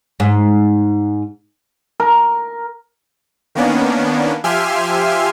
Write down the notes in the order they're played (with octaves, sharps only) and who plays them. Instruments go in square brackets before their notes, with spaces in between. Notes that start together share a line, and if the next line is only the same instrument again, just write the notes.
[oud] G#2
[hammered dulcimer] A#4
[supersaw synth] D#3 A#3 B3 C#4 D4
F3 G4 E5 G#5 C6 F6